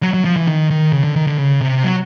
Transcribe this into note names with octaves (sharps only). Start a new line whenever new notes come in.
F#3
F#3
F3
E3
D#3
D#3
C#3
D3
D#3
D3
C#3
C3
F#3